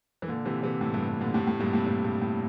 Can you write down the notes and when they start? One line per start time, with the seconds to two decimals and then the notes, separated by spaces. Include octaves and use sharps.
0.22 E3
0.28 A#2 D3
0.45 C3 E3
0.63 C3 E3
0.81 A2
0.94 G2
1.07 G2
1.20 A#2 D3
1.34 A2 C3
1.47 A2
1.59 G2 A#2
1.73 A2 C3
1.86 G2 A#2
2.04 G2
2.21 A2